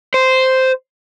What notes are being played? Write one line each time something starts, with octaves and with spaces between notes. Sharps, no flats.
C5